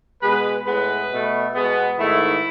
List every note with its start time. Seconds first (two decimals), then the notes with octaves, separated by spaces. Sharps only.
0.21 B2 G#3 B3 B4
0.65 A2 G#3 B3 B4
1.10 B2 A3
1.55 B2 G#3 B3
1.99 G#2 D#3 A3 E4